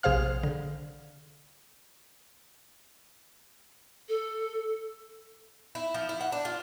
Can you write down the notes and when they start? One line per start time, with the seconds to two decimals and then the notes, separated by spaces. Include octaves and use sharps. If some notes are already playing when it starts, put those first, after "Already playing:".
0.03 A#1 C3 G#4 C5 F5 F6
0.43 D3
4.09 A4
5.75 E4
5.94 F3
6.09 E4
6.21 F#5
6.32 D4
6.45 F4